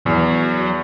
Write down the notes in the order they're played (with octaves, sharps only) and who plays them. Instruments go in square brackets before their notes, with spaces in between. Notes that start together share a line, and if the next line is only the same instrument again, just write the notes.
[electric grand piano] E2 [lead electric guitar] F#3